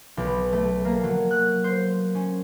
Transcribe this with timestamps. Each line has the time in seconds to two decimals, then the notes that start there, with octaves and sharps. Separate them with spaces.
0.17 B1
0.53 A3
0.85 A#3
1.04 F#3
1.31 F#6
1.64 C5
2.15 C#4